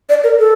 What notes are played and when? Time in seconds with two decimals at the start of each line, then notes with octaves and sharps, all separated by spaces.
0.09 D5
0.24 A#4
0.39 A4